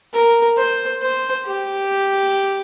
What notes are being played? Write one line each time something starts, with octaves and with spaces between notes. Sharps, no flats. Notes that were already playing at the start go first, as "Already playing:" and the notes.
A#4
C5
C5
G4